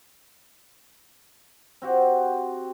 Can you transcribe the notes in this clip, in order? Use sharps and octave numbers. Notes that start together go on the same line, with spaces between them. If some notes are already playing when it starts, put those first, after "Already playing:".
C4 F#4 G4